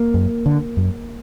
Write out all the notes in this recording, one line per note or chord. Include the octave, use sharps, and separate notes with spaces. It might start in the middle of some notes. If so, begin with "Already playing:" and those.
Already playing: A#3
F#2
D3
F#2